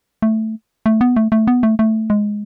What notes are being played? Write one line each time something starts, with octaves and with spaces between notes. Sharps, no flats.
A3
A3
B3
A3
A3
B3
A3
A3
G#3